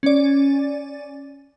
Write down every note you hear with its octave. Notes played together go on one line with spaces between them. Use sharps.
C#4 D5